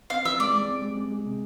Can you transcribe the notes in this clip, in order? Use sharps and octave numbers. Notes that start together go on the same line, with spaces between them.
C4 F5
E3 E5
G#3 D5
G#3
C4
G#3
G#3
G#3
C3